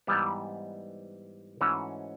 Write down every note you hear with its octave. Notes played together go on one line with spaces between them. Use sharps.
G#2 E3 G3 B3
G#2 E3 A3 C#4 F#4